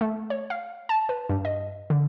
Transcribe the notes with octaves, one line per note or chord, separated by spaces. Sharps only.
A3
C#5
F5
A5
B4
G2
D#5
D3